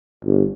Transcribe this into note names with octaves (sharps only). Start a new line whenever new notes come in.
G1